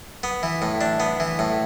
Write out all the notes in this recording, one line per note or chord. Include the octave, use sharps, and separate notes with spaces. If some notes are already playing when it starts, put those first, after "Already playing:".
B3
E3
A2
D4
B3
E3
A2